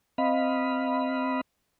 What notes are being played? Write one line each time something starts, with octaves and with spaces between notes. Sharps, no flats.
C4 D#5 F5 B5